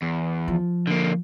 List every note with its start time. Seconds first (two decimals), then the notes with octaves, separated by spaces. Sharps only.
0.02 E2
0.48 F3
0.87 D3 A#3